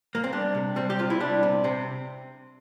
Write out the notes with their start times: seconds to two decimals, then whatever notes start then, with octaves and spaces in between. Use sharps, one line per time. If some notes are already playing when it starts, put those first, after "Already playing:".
0.15 A#3
0.24 C4
0.32 G3 D4
0.55 C3
0.76 G3 C4
0.90 G4
0.99 C3 F4
1.10 E4
1.20 G3 D4
1.43 C3
1.64 C3 C4